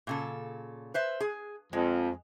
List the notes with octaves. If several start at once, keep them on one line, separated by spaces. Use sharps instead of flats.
A#2 C#3 A4
B4 C5 E5
G#4
F2 G#3